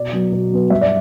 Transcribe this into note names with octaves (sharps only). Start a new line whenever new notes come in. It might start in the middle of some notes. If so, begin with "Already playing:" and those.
Already playing: B2 D5
F#3 B3
B2
F#3 B3
G2 E5
D5